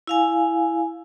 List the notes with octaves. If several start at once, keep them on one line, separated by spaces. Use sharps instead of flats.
E4 F5 G#5